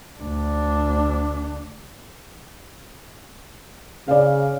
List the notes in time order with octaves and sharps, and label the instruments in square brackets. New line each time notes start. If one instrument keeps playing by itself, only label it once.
[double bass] D2 D4
[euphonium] C#3 [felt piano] D5 F5